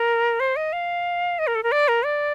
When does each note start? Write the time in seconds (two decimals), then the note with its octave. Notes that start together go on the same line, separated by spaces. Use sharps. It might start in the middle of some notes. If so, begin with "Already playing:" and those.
Already playing: A#4
0.40 C5
0.56 D#5
0.73 F5
1.39 D#5
1.47 A#4
1.55 A4
1.63 A#4
1.72 D5
1.88 A#4
2.05 D5